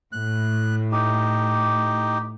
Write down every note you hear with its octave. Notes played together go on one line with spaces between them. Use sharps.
A2 F#6
D#4 G4